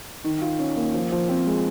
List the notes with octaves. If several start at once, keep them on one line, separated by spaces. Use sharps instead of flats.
D#3
F4
C#4
A#3
F3
F3
C4
G#3